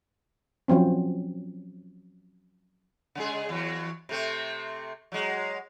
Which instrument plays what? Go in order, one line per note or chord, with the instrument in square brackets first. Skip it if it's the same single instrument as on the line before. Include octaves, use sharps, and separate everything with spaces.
[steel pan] F3 F#3 C4 C#4
[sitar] C#3 G#3 G#4
E2 F#3
C3 A3 C4
F#3 G#3